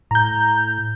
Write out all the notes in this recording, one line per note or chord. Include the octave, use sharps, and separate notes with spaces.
A2 A#5 G6